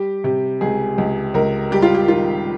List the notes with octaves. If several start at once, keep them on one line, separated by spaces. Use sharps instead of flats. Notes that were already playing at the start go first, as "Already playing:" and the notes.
Already playing: G3 G4
C3 G4
C#2 G#4
C#2
C#2 A#4
G3 G4
F4
G4
D#3 F4